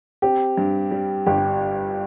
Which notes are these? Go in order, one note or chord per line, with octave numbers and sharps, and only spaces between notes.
C4 G4
G2
G3
G1 G4